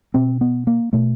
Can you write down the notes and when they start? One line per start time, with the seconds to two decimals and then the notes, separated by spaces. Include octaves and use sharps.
0.14 B2 C4
0.41 B3
0.67 A#3
0.93 B2 A3